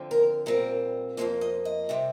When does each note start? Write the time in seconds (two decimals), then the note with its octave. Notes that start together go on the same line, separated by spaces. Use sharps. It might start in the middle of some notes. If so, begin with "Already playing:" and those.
Already playing: D3 F3 C4
0.11 A#4
0.46 A#2 G3 C4 A#4
1.17 F2 D3 F3 A#3 C5
1.41 D#5
1.65 D#5
1.89 C3 G3 C4